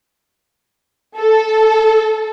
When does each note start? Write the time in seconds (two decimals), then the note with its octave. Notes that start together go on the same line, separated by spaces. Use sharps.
1.18 A4